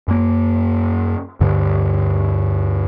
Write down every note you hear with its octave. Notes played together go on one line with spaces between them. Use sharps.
F#2 A#3
D2 G2 D3